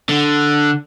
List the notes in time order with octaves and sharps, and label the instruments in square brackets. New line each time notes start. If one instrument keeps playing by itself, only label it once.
[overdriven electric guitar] D3